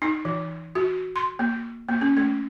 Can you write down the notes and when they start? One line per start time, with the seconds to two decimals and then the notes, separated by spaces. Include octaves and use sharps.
0.02 D#4
0.25 E3
0.75 F#4
1.16 C6
1.39 A#3
1.88 A#3
2.01 C#4
2.17 A3